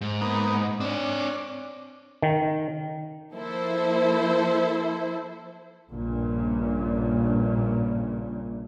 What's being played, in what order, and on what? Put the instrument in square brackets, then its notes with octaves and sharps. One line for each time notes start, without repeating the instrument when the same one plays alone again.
[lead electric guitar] G#2
[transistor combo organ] A#3 B3 D#4
[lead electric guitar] C4 C#5 [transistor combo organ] D4
[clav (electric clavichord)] D#3
[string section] F3 A#3 E4 A4 C5
[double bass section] A#1 G2 A#2 C#3